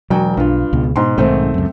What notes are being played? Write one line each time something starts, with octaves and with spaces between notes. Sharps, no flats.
E1 F#3 G5
B1 G2 F4
C#2 B2
G#2 B2 C6
B1 G#2 D#3 A3 C4 C5
C#2 F#2